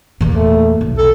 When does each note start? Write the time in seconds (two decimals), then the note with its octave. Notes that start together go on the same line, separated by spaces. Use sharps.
0.21 E2 A#2
0.34 A3
0.81 B1
0.98 A4